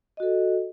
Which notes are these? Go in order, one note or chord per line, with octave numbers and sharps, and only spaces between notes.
F#4 A4 D#5